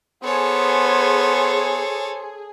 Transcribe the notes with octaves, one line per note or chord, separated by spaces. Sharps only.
B3 G#4 A4 C5 C#5